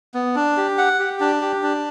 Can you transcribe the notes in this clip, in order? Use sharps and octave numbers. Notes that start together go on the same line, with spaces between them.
B3
D4
G4
F#5
G4
D4
G4
D4